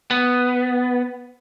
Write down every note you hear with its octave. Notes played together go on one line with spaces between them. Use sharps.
B3